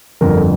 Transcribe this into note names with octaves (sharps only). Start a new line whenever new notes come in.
G1 F2 D3 A#4